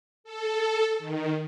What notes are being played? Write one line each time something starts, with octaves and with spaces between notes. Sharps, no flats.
A4
D#3